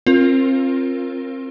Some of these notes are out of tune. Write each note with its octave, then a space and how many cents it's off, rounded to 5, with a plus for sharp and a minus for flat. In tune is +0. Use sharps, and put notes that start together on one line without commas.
C4 +30 F4 +0 A#4 +0